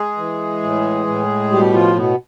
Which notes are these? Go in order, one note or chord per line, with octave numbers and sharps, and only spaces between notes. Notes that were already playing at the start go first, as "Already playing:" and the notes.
Already playing: G#3 G#4
E3
A2
A2
B2 G3 G4
F3 F4
B2 B3